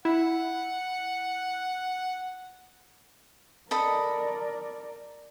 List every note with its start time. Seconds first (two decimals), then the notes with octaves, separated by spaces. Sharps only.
0.05 E4 F#5
3.71 A4 A#4 D5 D#5 B5